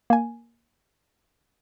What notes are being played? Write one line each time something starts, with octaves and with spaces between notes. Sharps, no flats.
A#3 G#5